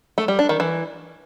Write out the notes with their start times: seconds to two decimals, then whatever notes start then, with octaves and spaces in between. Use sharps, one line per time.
0.18 A3
0.28 G3
0.39 D4
0.49 D#3
0.60 E3